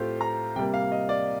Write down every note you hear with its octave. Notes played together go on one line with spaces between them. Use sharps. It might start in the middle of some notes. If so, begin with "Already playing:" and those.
Already playing: A2 A3 C4 F4 G4 A4 C5
A#5
C3 G3 A#3 G5
F5
D#5
D5